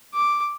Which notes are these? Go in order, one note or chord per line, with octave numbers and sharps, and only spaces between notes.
D6